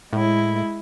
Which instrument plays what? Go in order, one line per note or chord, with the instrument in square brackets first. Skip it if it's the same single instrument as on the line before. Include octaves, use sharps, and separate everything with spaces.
[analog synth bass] A2 [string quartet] G#3 E4